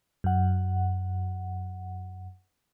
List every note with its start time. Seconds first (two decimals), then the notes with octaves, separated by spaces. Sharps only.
0.24 F#2 F#5